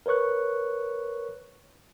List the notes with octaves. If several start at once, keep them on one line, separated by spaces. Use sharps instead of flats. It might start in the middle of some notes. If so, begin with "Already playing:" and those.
A#4 B4 C#5 C#6 F#6